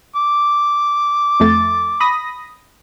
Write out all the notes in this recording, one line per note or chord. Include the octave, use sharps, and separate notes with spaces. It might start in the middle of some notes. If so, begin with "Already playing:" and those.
D6
F2 A3 A6
B5 D#6 A#6